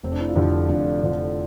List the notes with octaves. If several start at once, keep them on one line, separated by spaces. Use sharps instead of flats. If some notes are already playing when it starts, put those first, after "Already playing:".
F1 C4
D4
E4
F4
F2 D3 F3 E4 G4
F1 D4 F4
F2 D3 F3